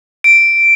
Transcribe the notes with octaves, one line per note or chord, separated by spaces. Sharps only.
D7